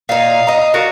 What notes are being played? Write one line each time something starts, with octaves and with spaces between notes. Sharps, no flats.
A#2 D#4 F5
D#5 A#5
F#4 A#4 D5 F5